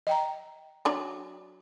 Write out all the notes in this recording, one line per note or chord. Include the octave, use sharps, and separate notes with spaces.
D#5 G5 A#5
F#3 D4 D5